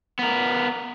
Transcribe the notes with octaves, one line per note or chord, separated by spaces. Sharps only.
B3 A#4